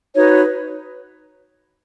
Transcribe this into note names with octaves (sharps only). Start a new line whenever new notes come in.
D#4 F#4 B4 C#5